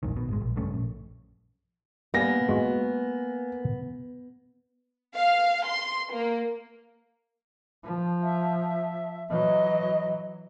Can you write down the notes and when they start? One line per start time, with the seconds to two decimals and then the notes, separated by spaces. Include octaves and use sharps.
0.03 E1 A#1 G#2 D#3
0.17 B2
0.28 G#1 G#3
0.41 A#1
0.56 F#1 G2 A3 C#4
0.74 A#1
2.14 G3 A#3 B3 G#5 A#6
2.49 G#3 F#4
5.17 F5
5.66 C6
6.13 A#3
7.84 F3
8.23 E5
9.30 E3 F#3 D#5